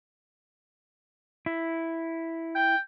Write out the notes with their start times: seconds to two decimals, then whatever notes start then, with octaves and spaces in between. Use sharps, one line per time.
1.46 E4
2.55 G5